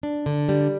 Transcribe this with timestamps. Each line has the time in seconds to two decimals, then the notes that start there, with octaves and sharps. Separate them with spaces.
0.03 D4
0.26 D3
0.49 G3